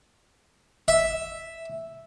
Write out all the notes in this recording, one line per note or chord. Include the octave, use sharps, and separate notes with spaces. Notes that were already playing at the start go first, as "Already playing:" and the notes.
E5